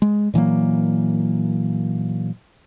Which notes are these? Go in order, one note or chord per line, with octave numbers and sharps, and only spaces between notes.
G#3
A#2 E3 F#3 A#3